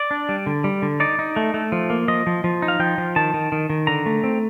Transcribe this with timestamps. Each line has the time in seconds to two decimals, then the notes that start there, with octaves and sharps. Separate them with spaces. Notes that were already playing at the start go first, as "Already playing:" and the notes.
Already playing: D5
0.11 D4
0.29 G3
0.46 D3
0.64 G3
0.82 D3
1.00 D#4 D5
1.19 D#4
1.36 A3
1.54 A3
1.72 F3
1.90 A#3
2.08 F3 D#5
2.27 F3
2.44 F3
2.62 D#4
2.68 F5
2.80 F3 G5
2.98 F3
3.16 D#3 A5
3.34 D#3
3.52 D#3
3.70 D#3
3.87 D3 A#5
4.06 A3
4.24 C4